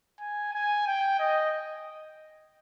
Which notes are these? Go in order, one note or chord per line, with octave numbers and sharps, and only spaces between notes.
G#5
G#5
G5
D#5